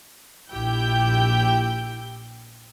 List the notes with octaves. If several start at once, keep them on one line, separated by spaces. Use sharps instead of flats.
A#1 E4 G4 G5 G6